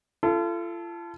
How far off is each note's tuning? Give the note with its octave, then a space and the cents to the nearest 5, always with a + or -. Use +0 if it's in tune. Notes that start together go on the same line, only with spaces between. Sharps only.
F4 -40 A4 +0